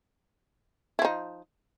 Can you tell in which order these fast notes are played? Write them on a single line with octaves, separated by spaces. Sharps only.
E4 F3 D#4